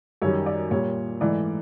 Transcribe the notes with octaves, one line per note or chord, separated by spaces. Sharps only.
F#2 D#3 G3 C#5
D5
A#2 G3 C#5
G#2 E3 A3 D5